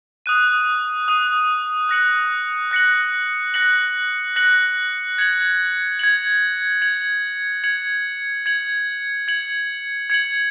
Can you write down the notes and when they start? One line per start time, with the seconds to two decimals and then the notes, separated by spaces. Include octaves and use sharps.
0.26 D#6 F#6 D#7
1.08 D#6 F#6 D#7
1.89 F#6 A#6 C#7 F#7
2.71 F#6 A#6 C#7 F#7
3.54 F#6 A#6 C#7 F#7
4.36 F#6 A#6 C#7 F#7
5.18 G#6 C#7 F#7
5.99 G#6 C#7 F#7
6.82 G#6 C#7 F#7
7.64 G#6 C#7 F#7
8.46 G#6 C#7 F#7
9.28 G#6 C#7 F#7
10.10 G#6 C#7 F#7